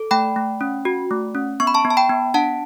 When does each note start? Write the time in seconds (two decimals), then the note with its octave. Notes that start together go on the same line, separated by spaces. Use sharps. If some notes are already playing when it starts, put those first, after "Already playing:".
Already playing: A4
0.11 A3 G5 B5
0.36 A3
0.61 C#4
0.85 F#4
1.11 A3
1.35 C#4
1.60 B3 C#6
1.67 B5
1.74 A5 C#6
1.85 B3
1.90 A5
1.97 G5 B5
2.09 B3
2.34 D4 F#5 A5